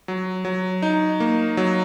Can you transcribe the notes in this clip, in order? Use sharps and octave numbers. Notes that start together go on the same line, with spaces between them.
F#3
F#3
D#4
A#3
F#3